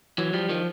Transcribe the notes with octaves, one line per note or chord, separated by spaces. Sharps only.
E3 F#3
F3 G3
D#3 F3